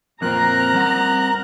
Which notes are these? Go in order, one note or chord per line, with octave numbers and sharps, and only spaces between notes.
F2 A#2 C4 A#4 A#5 F#6
G3 C4 F#5